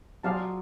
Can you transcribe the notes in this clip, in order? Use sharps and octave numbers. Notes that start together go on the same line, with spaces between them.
F#3 F4 G#4 D5 F5 A5